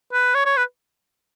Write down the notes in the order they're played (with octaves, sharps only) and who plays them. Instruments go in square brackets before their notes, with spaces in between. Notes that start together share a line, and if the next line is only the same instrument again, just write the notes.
[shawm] B4
C#5
C#5
B4